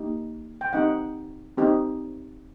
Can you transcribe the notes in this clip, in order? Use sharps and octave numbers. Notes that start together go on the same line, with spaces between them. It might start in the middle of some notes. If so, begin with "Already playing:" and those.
Already playing: A#3 D#4 G4
G5
C4 D#4 G4 F#5
C4 D#4 G4